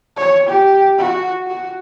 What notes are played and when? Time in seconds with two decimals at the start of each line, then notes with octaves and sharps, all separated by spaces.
0.17 C#5
0.46 G4
0.98 F#4
1.47 F#4